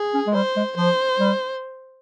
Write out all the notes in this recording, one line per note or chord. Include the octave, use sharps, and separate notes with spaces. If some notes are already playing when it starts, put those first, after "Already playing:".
Already playing: G#4
C#4
G#3
G3 C5
G#3
F3 C5
G3